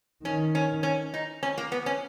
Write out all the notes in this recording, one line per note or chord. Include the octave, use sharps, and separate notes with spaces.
D#3 C#4
C#4
C#4
D#4
C#4
A#3
B3
C#4